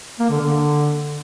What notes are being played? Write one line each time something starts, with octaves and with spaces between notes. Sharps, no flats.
A#3
D3
D3